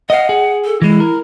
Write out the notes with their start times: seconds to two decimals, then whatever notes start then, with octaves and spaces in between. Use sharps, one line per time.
0.10 D#5 F5 F#5
0.29 G#4
0.65 A4
0.82 E3 G#3 E4
1.00 A#4